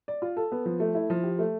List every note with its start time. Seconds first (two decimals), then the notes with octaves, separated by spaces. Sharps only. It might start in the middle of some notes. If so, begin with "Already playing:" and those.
0.08 D5
0.22 F4
0.37 A4
0.52 B3
0.65 F3
0.80 A3
0.95 E4
1.10 F3
1.23 G4
1.39 A3